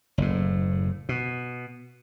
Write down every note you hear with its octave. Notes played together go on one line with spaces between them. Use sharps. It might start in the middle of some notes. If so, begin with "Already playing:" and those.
F#1 A2
B2